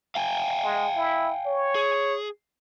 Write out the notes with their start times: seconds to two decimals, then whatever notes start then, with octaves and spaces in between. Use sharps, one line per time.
0.15 F5 G5 G#5
0.64 G#3
0.96 E4
1.46 C#5
1.75 G#4